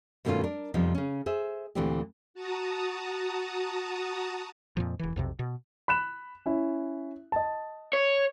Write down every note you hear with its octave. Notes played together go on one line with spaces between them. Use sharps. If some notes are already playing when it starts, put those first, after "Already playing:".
G2 B2 D#3 A3 C#4 F4
D4 A#4
F2 C3 F3 G3 B3 D#4
C#3 C#4
G#4 C5 E5
D2 A#2 E3 C4 D4 G4
F#4 A5 A#5 D#6
F2 A#2 F3
E1 E3
B1 F2 C3
B2
B5 F#6 E7
C#4 E4
D#5 A5
C#5